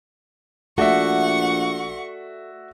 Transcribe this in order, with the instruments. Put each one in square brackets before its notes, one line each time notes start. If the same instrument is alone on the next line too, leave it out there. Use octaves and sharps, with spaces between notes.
[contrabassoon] A#1 [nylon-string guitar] A3 [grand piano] F#4 D5 E5 [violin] F#5 C#6